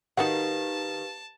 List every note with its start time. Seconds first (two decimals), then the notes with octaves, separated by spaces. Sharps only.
0.17 D#3 D#4 F#4 G4 B4 F5 F#5 A5